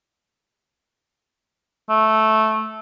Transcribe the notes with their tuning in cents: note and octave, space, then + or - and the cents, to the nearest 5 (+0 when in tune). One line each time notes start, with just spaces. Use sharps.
A3 -10